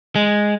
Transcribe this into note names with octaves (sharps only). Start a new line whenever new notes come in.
G#3